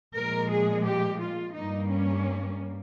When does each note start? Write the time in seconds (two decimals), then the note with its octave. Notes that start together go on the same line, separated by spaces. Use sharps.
0.14 A#2 F3 G#3 A#4
0.50 G#4
0.85 G4
1.20 F4
1.54 G2 G3 A#3 D#4
1.90 C#4